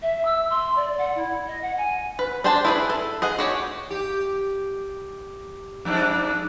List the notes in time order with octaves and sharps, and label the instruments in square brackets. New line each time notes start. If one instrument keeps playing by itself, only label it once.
[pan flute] E5
E6
C6
D5
F#5
E4
D#5
F#5
G#5
[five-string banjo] B4
D4 G#4 C5 G5 A5
E4 G#4 B4
A4
G#4 D#5 F#5
F#4 G4 C#5
[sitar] G4
F2 G#2 D4